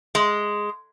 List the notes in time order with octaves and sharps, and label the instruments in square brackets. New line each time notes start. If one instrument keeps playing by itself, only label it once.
[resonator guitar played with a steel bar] G#3